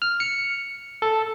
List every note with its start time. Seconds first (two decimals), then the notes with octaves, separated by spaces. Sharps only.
0.02 F6
0.20 C#7
1.02 A4